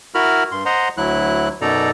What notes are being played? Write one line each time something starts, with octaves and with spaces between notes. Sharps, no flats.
E4 F#4 A#4 B5 F6
G2 C6
C5 D#5 F#5 A#5 C6
D2 F#3 E4 F#6
F#2 B2 D#4 A4 D5 A#5